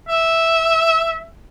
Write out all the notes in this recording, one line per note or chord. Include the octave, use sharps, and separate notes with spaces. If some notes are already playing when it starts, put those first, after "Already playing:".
E5